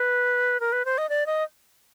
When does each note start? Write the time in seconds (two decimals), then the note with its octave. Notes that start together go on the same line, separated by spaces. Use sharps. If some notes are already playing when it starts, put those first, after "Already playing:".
Already playing: B4
0.60 A#4
0.72 B4
0.85 C5
0.98 D#5
1.09 D5
1.26 D#5